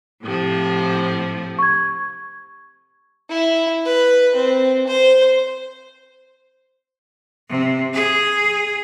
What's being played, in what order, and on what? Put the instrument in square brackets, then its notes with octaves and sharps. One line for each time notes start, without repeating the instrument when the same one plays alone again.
[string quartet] A2 C3 F3
[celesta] C#6 G#6
[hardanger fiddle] E4
B4
C4
C5
[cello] C3
G#4